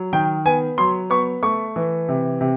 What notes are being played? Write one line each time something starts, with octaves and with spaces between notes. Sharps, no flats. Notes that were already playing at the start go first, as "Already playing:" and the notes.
Already playing: F#3
D#3 G5
B3 G#5
F#3 C6
B3 C#6
A3 C#6
E3
C3
C3